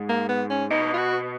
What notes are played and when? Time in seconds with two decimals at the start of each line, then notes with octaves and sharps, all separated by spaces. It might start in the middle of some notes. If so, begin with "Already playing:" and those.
Already playing: G#2
0.09 A#3
0.28 B3
0.50 C#4
0.70 B2 D#4
0.94 F4
0.98 F#4